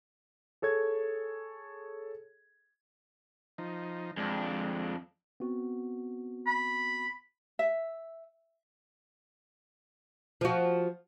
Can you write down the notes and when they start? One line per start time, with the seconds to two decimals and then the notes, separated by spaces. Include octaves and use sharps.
0.62 G#4 A4 C#5 G#6
3.58 F3 D#4
4.17 F2 G#3 D4
5.40 B3 C4 F#4
6.46 B5
7.59 E5
10.41 F3 F#4